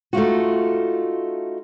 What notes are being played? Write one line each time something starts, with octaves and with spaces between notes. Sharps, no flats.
A3 D#4 F4 F#4